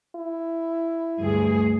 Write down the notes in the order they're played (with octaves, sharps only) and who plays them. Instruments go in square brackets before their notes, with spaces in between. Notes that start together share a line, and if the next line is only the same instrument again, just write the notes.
[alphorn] E4
[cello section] D2 G2 G#4